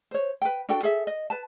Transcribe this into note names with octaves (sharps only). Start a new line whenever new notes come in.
C5 C#5
B4 G5
D4 F#4 A4 G5
G#4 A4 E5
D#5
B4 A5